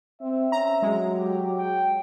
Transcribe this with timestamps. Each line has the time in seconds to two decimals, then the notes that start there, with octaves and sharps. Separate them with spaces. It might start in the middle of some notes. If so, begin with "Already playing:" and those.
0.21 C4 E5
0.52 C#4 A#5
0.82 F#3 G#3
1.16 G4
1.58 G5